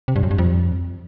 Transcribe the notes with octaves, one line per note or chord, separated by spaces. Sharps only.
C3
G2
F#2
G2
F2